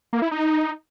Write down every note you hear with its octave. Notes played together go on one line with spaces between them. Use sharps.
A#3
E4
D#4